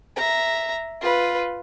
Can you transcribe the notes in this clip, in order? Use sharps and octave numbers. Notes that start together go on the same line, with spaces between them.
E5 A#5
F4 B4